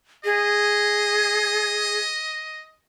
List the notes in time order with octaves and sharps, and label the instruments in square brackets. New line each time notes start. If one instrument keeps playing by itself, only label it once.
[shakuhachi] G#4 [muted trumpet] D#5